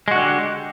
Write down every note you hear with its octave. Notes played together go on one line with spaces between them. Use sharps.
D3 G#3 F#4 G4